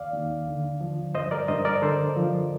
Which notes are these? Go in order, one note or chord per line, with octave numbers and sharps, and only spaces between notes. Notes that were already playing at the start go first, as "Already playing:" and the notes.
Already playing: D#2 D5 F5
D#2
D3
F3
G2 C5 D#5
A#4 D5
G2 C5 D#5
A#4 D5
D3 A4 C5
F3